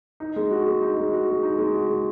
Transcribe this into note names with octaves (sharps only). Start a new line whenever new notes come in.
D#4
G#3
F#4
G#3
D#4
G#3
F#4
G#3
D#4
G#3
F#4
G#3